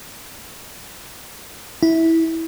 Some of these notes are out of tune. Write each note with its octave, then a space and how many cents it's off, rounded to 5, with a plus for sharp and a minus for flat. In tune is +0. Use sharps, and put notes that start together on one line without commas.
E4 -15